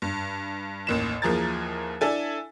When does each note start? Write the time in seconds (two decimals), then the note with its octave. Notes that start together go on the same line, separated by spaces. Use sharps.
0.02 G2
0.87 A1 D#2 E7
1.22 D#2 E3 F3 G#4 A#4 A6
2.01 D4 E4 A4 G#5